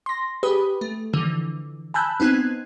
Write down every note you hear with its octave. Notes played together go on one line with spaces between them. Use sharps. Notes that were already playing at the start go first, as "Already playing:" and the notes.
C6 A#6
G4 G#4 B4 B5 D#6
A3
D3 E3 F3
G#5 A5 B5 E6 F#6 G6
B3 C4 D#4 F#6 G#6